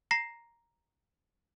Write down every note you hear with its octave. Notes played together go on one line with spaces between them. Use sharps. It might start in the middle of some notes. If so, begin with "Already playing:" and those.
A#5 A#6 C7